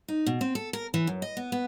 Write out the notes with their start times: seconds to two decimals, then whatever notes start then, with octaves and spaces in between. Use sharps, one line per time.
0.08 D#4
0.26 B2
0.41 C4
0.55 A4
0.73 A#4
0.94 E3
1.07 F#2
1.22 D#5
1.37 B3
1.52 B3